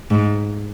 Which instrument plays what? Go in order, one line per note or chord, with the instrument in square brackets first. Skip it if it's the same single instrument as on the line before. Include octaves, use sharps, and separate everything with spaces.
[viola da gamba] G#2